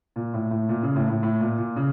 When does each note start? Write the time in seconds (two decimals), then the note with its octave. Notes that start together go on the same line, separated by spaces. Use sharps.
0.16 A#2
0.34 A2
0.51 A2
0.69 A#2
0.83 C#3
0.96 A2
1.09 A2
1.23 A2
1.41 A#2
1.58 A#2
1.76 C#3